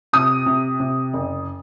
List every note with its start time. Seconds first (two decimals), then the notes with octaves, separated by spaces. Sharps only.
0.13 C3 D#6
0.46 C3
0.80 C3
1.13 F#1